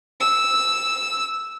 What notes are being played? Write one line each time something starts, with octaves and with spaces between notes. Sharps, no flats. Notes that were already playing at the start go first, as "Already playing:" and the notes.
E6